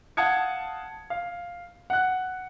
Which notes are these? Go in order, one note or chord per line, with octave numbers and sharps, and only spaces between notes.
F5 F#5 A5 D#6 G#6 C#7
F5
F#5 F#6